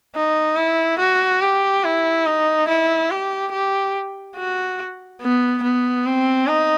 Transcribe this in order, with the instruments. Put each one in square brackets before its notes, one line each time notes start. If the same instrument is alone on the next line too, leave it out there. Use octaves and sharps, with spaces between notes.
[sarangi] D#4
E4
F#4
G4
E4
D#4
E4
G4
G4
F#4
B3
B3
C4
D#4